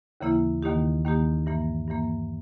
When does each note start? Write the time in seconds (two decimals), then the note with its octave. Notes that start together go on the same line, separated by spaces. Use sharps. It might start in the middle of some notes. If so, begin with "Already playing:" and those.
0.21 D#2 C#3 E3 A#3 E4
0.63 D#2 D#3 A#3 D#4 G4
1.05 D#2 D#3 A#3 D#4 G4
1.46 G2 E3 A#3
1.88 G2 E3 A#3